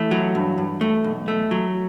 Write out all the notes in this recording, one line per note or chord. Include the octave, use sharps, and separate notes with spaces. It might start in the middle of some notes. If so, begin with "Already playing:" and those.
Already playing: E3 A3 E4
F#3
G2
G2
A3
B1
A3
F#3